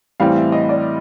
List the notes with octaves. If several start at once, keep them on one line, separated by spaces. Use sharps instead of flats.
A2 E3 G3 C4 F5
E5
D#5
D5